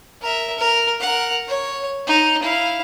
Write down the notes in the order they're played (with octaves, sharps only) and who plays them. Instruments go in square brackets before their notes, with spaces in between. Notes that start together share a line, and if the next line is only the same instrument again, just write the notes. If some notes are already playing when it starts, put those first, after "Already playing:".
[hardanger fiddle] A#4 E5
A#4
A#4 F#5
C#5
D#4
E4 F5